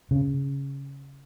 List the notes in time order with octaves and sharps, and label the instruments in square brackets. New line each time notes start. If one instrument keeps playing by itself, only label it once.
[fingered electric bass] C#3